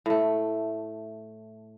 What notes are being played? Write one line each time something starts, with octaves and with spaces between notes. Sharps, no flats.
A2 A3